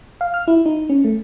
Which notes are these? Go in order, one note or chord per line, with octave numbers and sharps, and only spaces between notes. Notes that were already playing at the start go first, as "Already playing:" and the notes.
F5
F6
E4
D#4
C#4
A3